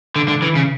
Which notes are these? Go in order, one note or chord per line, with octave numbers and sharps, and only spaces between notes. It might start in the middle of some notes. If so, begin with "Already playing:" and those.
D3
D3
E3
C#3